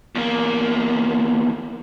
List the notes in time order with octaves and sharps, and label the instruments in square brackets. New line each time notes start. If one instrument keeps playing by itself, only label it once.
[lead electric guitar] E2 A#3